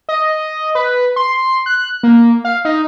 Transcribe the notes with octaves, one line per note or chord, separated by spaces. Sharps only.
D#5
B4
C6
F#6
A#3
F5
D#4